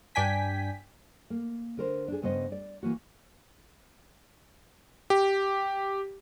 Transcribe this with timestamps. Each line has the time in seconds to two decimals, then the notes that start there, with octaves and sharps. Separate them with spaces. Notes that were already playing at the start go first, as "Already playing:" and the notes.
0.15 G2 D4 G5 G#5 B6
1.30 A#3
1.77 D3 A#4 C5
2.08 D4 G#4
2.22 G2 C#3 B3 C5 D#5
2.52 D5
2.83 E3 A#3 F#4
5.10 G4